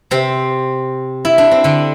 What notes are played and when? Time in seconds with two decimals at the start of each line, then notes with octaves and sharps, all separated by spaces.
0.11 C3 C4
1.25 E4
1.38 D4
1.51 C4
1.64 D3 D4